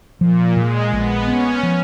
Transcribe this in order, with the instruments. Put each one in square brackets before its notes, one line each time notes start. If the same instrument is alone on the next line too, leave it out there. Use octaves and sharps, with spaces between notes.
[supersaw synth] A#2 [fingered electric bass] F3
[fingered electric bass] A#2 [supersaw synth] G#3
[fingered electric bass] A#1 [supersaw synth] B3
[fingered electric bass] B3 [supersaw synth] C#4
[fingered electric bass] F3